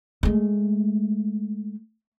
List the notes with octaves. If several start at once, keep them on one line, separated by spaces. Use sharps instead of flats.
G#3 A3